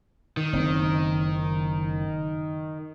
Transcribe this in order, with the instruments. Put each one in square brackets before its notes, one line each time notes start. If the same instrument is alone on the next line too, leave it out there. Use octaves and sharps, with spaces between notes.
[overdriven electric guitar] D#3
[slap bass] F#1 C4